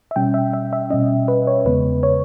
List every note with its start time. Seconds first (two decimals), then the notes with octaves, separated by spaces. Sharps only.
0.11 E5
0.16 B2 G3 C#4 G5
0.34 E5
0.53 E5
0.73 E5
0.90 B2 G3 C#4 D#5
1.28 B4
1.47 C#5
1.65 E2 C#3 G#3 B3 B4
2.03 C#5